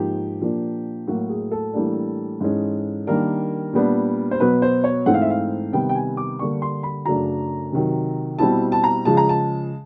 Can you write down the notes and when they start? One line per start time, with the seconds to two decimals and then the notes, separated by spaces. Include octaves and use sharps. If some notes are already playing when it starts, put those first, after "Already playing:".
Already playing: G#2 F3 A#3 D#4 G4
0.41 A#2 F3 A#3 D4
1.07 A2 F#3 A#3 F#4
1.29 G#4
1.51 A4
1.73 A2 E3 G3 A#3 D4
2.41 G#2 E3 G#3 C#4
3.07 D#3 G3 A#3 D4 A#4
3.73 A#2 G3 B3 D4
4.31 C5
4.40 B2 F#3 B3 B4
4.62 C5
4.84 C#5
5.06 G#2 E3 A3 C4 F#5
5.14 F5
5.22 E5
5.30 F5
5.72 C3 D#3 G3 B3 G5
5.89 G5
5.95 G#5
6.17 D6
6.39 D3 G3 A#3 D4 C#6
6.62 C6
6.83 B5
7.06 F#2 C#3 F#3 A3 D4 A#5
7.72 C3 D#3 F#3
8.39 B2 G3 C4 E4 A5
8.72 A5
8.84 A#5
9.05 C#3 F3 G#3 A5
9.17 A#5
9.29 A5